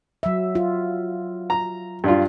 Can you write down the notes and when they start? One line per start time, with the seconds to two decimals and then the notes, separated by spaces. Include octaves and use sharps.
0.23 F#3 E5
0.55 F4
1.50 A#5
2.04 G2 D4 F4